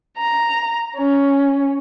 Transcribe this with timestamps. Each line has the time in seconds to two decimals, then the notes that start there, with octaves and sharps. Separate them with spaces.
0.17 A#5
0.96 C#4